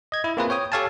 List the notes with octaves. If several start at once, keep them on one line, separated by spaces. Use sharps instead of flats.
D#5 G#6
E4
A#3 C4 F4 G#4 B4
C#5 G5 D#6
G4 A4 C#5 F5 G#5 A5